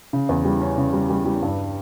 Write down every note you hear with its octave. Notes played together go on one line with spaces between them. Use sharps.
C#3
E2
G3
C#4
C#3
G3
G3
G3
G2